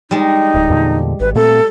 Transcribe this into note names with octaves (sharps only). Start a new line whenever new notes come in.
G3 G#3 D#4
D1
E2 A#2 D3
G#1 B4
A#2 A3 C4 A4